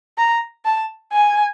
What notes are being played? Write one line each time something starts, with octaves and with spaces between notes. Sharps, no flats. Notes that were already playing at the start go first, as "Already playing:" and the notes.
A#5
A5
G#5